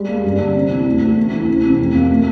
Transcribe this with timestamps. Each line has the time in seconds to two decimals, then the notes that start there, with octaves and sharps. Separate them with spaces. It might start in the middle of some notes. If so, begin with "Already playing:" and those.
Already playing: G3 G#3
0.08 A#3
0.24 G2
0.40 D3
0.55 C3
0.70 E3
0.86 D2
1.01 D2
1.17 A3
1.33 E3
1.48 C3
1.63 C3
1.79 F2
1.95 A#3
2.10 A3